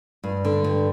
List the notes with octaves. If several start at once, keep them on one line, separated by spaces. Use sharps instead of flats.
G2
D3
G2